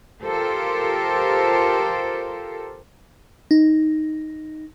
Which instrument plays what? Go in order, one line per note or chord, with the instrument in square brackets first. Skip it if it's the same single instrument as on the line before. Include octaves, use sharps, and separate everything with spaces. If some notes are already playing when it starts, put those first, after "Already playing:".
[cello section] F4 G4 A4 A#4 C5
[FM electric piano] D#4